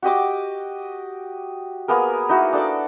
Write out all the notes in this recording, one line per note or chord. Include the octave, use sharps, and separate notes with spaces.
F#4 G4 D#5 D6
A#3 B3 G#4 A#4
D#4 E4 F#4
D4 A4 D5